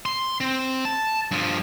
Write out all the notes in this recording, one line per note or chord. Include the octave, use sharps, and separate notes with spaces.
C6
C4
A5
G2 F3